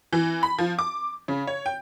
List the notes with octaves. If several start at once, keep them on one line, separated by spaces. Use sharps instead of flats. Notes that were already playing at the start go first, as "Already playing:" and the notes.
E3
B5
F3
D6
C#3
C#5
G5